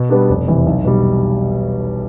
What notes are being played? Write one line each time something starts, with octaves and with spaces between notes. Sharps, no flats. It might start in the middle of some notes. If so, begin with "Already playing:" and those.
Already playing: B2
G3 B3 D4 G4
F1
E2 C3
B1
B2 G3